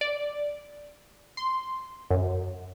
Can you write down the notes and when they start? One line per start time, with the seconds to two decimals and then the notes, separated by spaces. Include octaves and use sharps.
0.01 D5
1.37 C6
2.10 F#2